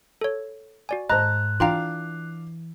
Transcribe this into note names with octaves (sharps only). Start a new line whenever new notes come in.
A4 C#5
F#4 D5 G#5
G#2 C5 D#5 A5 A#5 F#6
E3 D4 F4 F5 G5 A#5